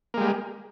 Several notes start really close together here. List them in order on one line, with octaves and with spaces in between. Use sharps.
A#3 G#3 G3